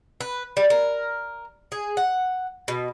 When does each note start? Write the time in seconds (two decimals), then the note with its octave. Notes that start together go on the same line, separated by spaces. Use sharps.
0.21 B4
0.57 G3
0.70 A#4
1.72 G#4
1.97 F#5
2.68 B2